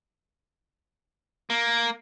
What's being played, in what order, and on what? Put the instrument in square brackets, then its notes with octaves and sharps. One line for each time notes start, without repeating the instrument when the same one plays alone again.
[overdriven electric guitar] A#3